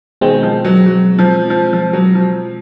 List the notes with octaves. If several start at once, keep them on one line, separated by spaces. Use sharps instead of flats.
B2 D#3 G#3 C4
F3
F#3
F#3
F3
F3
F3
F#3
F3